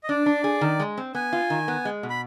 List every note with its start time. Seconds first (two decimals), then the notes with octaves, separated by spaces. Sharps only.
0.04 D#5
0.09 D4 D5
0.26 D4
0.44 G#4
0.61 D#3
0.80 G#3
0.98 C4
1.15 B3 G#5
1.33 F4
1.50 D#3
1.68 B3
1.85 G#3
2.03 B2
2.10 B5